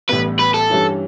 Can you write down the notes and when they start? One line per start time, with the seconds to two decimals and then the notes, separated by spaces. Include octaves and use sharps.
0.09 A1 A2 G3 B3 B4
0.39 B4
0.54 A4
0.70 G2 E3 G3 C#4 E4